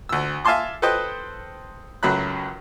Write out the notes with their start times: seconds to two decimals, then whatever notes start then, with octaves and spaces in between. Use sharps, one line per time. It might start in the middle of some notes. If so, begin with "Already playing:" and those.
0.09 D2 E6
0.45 E5 F5 G#5 A5 C6 D6
0.82 A4 B4 C5 D#5 G5 F#6
2.03 C#2 F#2 F#3 A3 B5 F#6